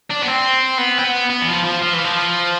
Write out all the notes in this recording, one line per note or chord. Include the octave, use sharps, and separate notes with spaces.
D4
B3
C4
B3
C4
B3
B3
E3
F3
F3
F3
E3
F3